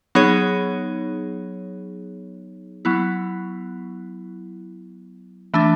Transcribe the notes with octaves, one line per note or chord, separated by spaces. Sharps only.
F#3 B3 D#4 G#4 C#5
F#3 B3 E4
E3 A3 D4